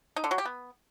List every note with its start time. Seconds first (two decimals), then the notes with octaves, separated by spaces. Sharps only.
0.16 D#4
0.24 D3
0.31 F#3
0.38 G4
0.45 B3